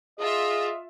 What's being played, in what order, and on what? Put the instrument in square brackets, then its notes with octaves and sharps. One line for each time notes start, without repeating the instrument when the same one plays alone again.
[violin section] F4 E5 [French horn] G#4 [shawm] D#5